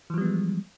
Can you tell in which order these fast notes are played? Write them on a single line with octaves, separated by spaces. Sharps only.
E3 F3 G3 B3 G#3